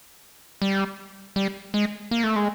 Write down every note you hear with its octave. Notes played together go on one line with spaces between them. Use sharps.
G3
G3
G#3
A#3
A3
G#3